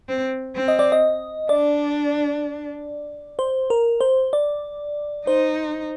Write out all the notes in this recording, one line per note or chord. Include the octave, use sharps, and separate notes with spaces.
C4
C4
D#5
D5
D#5
D4 D5
C5
A#4
C5
D5
D#4 C5